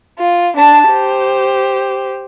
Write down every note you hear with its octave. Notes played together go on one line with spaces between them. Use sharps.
F4
D4 A5
G4 C5